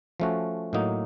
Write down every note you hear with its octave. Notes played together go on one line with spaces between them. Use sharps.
F3 A3 C#4 F#4
A2 F#3 A#3 D#4